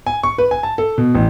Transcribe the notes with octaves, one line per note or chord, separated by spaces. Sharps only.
G#5
C#6
B4
G#5
A5
A4
B2
A1